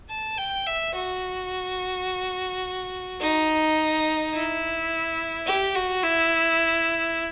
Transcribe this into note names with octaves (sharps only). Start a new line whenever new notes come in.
A5
G5
E5
F#4
D#4
E4
G4
F#4
E4